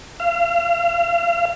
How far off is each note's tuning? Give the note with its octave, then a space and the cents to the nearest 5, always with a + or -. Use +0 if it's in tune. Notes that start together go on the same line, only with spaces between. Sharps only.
F5 -35